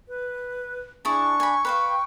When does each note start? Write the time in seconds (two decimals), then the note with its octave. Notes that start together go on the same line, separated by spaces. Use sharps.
0.08 B4
1.05 D4 E4 G#4 A5 C#6
1.40 G#5 B5
1.65 B4 C5 F5 G5